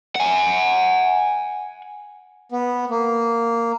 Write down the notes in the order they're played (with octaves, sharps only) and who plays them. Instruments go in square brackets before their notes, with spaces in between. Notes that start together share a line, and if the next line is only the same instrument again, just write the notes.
[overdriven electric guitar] F#5 G#5
[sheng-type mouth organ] B3
A#3